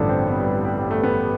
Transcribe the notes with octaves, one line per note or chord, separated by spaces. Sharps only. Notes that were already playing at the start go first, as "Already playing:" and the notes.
Already playing: A1 G2 D3 F3 D4 A4
C4
B3
G3
G3
G3
A3
B3